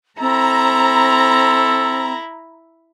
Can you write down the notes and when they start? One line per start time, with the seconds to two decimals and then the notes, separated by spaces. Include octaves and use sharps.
0.21 C4 E4 A4 A#5